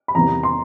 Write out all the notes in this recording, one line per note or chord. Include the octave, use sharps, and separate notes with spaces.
B5
E2 C3 D#3 G3 B3 A#5
C6